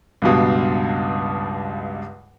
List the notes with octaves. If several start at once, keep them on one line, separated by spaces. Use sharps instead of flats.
C#2 G2 B2